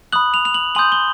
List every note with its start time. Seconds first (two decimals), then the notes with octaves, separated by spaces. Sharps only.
0.12 B5 D#6 F#6 F#7
0.34 F7
0.45 F7
0.54 F#7
0.75 G#5 C6 D#6 G6 F#7
0.92 G7